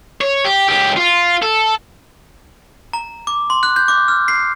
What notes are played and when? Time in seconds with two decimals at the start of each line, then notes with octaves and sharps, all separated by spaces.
0.21 C#5
0.45 G4
0.69 C#2 G4
0.96 F4
1.42 A4
2.93 A#5
3.27 D6
3.50 C6
3.63 F#6
3.76 G6
3.88 D6
4.08 F6
4.28 C7